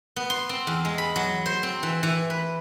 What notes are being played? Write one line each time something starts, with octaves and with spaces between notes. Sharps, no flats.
B3
C6
C4
E2
G#3
B5
F#3
C5
C4
E3
E3
B4